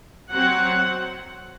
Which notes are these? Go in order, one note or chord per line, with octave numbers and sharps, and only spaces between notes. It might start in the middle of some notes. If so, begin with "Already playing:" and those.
F#3 C4 F#5